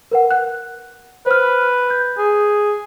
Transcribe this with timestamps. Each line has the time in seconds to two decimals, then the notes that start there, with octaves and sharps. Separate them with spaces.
0.11 A#4 B4 F#5
0.31 F#5 F#6
1.26 B4 C5 F6
1.90 G6
2.18 G#4